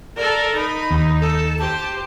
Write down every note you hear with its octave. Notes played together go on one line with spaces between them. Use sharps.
A4 A#4 D5
D#4 B5
D#2
A4
G4 C5 A5